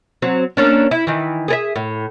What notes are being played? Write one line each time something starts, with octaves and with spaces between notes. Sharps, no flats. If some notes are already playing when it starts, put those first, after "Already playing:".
F#3 C4
A#3 C#4 D4
E4
D#3 E3
G#4 A4 E5
A2